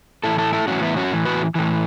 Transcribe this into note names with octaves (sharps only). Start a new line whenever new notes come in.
A2 E3 E4 A4
E4 A4
E4 A4
A2 E3 C#4 F#4
B3 E4
C#4 F#4
A2 E3
F#4 B4
A2 E3